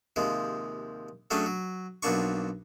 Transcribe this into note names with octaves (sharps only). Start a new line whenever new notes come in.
D#2 C3 F3 G#3
F#3 A3 C#4 D4 G4 G#4
F#3
B1 F3 F#3 A#3 D4 C#6